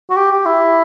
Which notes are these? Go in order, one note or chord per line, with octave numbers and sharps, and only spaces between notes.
F#4
G4
G4
E4